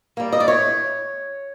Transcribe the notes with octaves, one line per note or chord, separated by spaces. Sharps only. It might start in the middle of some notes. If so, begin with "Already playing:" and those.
G3 A#3
D#5
D5
A2 C#5